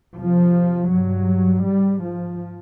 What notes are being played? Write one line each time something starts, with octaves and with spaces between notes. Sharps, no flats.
F2 C3 F3
G2 F#3
G#2 G3
F3